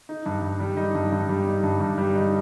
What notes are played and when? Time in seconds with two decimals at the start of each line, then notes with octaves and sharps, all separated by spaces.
0.09 D#4
0.26 G2
0.43 G2
0.60 G3
0.77 D#4
0.95 G2
1.12 G2
1.29 G3
1.46 D#4
1.64 G2
1.81 G2
1.98 G3
2.15 D#4